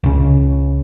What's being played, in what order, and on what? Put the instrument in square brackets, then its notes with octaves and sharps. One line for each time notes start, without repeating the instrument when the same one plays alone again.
[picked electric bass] C#2 C#3